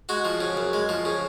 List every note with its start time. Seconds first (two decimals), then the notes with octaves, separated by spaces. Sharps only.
0.09 G#3 F#4
0.25 F3
0.41 C#3
0.57 F#2
0.73 G#3
0.89 F3
1.05 C#3